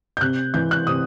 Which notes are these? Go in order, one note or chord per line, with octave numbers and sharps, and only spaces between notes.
G6
C3 F#6
E3 G6
F#6
C3 D#6